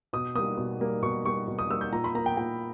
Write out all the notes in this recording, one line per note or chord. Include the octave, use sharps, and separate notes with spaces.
B2 D#6
G3 A#3 D#6
B2
G3 A#3
B2 C#6
G3 A#3 C#6
B2
D#6
G3 A#3 E6
G6
A#2 A#5
B5
A#3 A#5
G5
A#2 G5